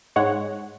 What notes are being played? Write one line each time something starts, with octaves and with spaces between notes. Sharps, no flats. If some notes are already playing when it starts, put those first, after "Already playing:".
G#2 G#3 C#5 F#5